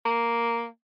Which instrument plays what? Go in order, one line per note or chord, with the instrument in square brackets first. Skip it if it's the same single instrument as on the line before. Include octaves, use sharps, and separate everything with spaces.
[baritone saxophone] A#3